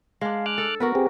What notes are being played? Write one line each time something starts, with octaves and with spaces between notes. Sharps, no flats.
G#3 D4 F5
D6 F6 F#6
A4
B3 F#4 A#4 B4
C4 G4 G#4